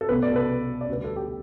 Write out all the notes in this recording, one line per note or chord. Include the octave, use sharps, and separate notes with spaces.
A4
B1 B2 A3 B4
D5
A4
B4
D5
D2 D3 G3 B4
A4
G4